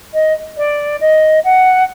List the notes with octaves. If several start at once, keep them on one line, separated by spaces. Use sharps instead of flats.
D#5
D5
D#5
F#5